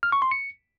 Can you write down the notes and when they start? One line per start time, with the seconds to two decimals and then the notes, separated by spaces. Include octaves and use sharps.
0.03 F6
0.12 C#6
0.22 C6
0.31 C#7